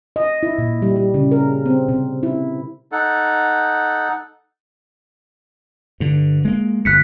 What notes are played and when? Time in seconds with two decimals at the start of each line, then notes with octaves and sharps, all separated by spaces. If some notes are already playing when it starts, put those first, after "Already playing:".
0.16 D#5
0.43 E4
0.58 A#2
0.82 G3
0.96 G3
1.14 C#3
1.32 A#4
1.66 C4
1.89 C3
2.23 E4
2.92 D#4 A4 F#5
6.00 G2 D3
6.45 G#3 A#3
6.85 G1 F2 F#6 B6 C#7